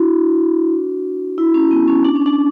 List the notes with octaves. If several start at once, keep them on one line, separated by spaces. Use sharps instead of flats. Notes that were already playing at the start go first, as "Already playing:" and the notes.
Already playing: D4 E4 F#4
E4
C#4
B3
C#4
D4
C#4
D4